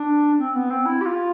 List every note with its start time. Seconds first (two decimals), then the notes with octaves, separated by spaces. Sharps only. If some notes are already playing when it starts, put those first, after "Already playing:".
Already playing: D4
0.38 C4
0.54 B3
0.70 C4
0.85 E4
1.01 G4
1.05 F4